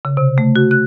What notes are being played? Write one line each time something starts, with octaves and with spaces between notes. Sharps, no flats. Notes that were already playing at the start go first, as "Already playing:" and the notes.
C#3
C3
A3
F#4
F#6